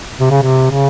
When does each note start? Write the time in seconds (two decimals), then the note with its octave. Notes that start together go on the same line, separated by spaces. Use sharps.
0.20 C3
0.31 C#3
0.42 C3
0.71 C#3